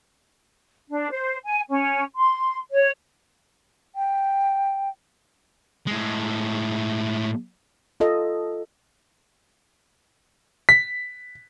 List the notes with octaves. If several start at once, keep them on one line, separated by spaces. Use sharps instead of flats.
D4
C5
G#5
C#4
C6
C#5
G5
A2 G#3
F4 A4 D#5
B6